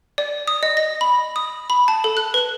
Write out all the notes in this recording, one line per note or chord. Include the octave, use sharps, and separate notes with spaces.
D5
D#6
D#5
A#6
B5
D#6
B5
A5
A4
F#6
B4